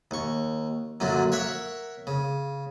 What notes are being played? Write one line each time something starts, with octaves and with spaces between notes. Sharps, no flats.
D#2 C#6
F#2 A#2 D3 F#3
A#4 C#5 E5 F#5
C#3